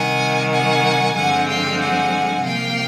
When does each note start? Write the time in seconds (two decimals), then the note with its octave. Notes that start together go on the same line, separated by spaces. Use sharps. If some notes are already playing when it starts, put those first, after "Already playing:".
Already playing: C3 D#3 G3 F#5 G#5
0.51 F#5 G#5
1.15 G2 D3 F3 G#3 C4 F#5 G#5
1.47 F5 G5
1.80 F#5 G#5
2.44 C3 F3 A#3 F5 G5